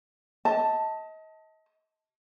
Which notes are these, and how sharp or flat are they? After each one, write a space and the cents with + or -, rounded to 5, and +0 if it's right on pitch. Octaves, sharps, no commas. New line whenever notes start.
D#5 +35 A5 +5